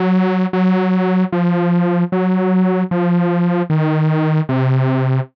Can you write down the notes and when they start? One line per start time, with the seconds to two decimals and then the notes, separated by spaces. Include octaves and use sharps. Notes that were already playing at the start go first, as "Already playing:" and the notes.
Already playing: F#3
0.53 F#3
1.32 F3
2.12 F#3
2.91 F3
3.70 D#3
4.49 C3